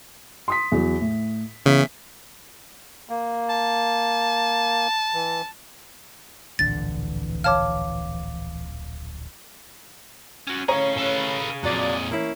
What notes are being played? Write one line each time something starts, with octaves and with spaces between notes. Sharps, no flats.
C6 D#6 B6
E2 F#3
A2
C#3 E3 B3 B6
A#3
A5
E3
D1 A#1 D3 E3 A6
C#5 F5 A5 D6 F6
C#4 F#4
A2 C#4 G#4 C#5 F5 A#5
A4 B4
F2 A#2 F#3 D5
A#3 C#4 E4